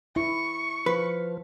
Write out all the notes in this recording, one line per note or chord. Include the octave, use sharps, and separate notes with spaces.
E4 C#6
F3 B4